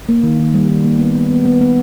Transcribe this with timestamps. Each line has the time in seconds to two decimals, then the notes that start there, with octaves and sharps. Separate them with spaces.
0.09 A#3
0.23 D#3
0.39 D#3
0.54 G3
0.69 D#3
0.85 A#3
0.99 B3
1.15 B3
1.31 B3
1.45 B3
1.61 B3